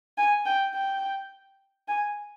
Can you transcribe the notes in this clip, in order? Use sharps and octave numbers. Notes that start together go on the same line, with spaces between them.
G#5
G5
G5
G#5